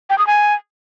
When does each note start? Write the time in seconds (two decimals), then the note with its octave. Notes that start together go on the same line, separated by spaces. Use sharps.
0.10 G5
0.18 D#6
0.27 G#5